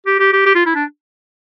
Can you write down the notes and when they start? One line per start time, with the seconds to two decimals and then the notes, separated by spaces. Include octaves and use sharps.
0.06 G4
0.20 G4
0.33 G4
0.46 G4
0.55 F4
0.66 E4
0.75 D4